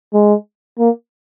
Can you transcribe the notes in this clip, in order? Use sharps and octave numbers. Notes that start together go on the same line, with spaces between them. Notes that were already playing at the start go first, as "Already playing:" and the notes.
G#3
A#3